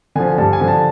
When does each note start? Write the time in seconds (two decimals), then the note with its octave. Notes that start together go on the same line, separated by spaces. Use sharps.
0.15 D3 F3 G#5
0.38 G2 A5
0.53 G#5
0.60 D3 F3
0.68 A5